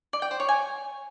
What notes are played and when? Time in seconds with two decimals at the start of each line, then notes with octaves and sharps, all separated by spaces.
0.13 D5
0.22 G5
0.31 C5
0.40 C#5
0.49 G#5